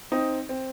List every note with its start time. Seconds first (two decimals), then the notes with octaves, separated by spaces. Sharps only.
0.12 C4 D#4
0.49 C4